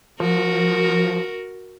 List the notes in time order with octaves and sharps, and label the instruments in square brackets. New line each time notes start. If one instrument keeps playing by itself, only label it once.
[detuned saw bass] F3 [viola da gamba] F#4 A#4